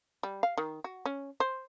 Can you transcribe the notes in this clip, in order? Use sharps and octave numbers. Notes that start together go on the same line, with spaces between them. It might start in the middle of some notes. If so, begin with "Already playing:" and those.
G3
F5
D#3
F#4
C#4
C5